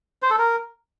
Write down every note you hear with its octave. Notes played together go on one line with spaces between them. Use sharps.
C5
A4
A#4